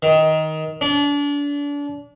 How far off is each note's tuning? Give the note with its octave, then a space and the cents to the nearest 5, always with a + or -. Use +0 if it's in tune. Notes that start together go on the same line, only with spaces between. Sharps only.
D#3 +15
D4 -35